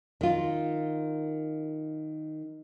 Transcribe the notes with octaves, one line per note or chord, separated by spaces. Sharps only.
D#3 F4